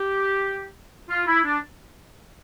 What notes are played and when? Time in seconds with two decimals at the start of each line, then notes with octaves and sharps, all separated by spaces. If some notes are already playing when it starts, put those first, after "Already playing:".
Already playing: G4
1.09 F4
1.27 E4
1.44 D4